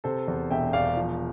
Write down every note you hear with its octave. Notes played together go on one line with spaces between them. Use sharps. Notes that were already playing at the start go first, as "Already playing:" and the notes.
C3 A4 C5
E2
E1 E5 G5
E1 D5 F5
F3